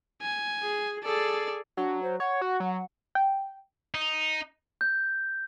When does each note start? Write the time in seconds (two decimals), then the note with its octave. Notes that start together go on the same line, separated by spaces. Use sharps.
0.22 G#5
0.63 G#4
1.04 G#4 A4 D5
1.77 F#3 D4
2.03 C5
2.20 C#5 F#5
2.41 F#4
2.60 F#3
3.15 G5
3.95 D#4
4.81 G6